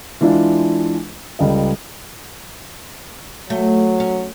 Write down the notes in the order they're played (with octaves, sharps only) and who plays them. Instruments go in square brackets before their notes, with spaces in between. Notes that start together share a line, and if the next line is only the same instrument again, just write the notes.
[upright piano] E3 G#3 D4 F4
C#2 G3 A4 D#5
[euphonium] F#3 [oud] A3
[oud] C#4